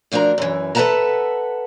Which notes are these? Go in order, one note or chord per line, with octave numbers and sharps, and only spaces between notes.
D2 F3 D4 A#4 A#5
F#2 E3
A4 B4 E5 F#5 A5 A#5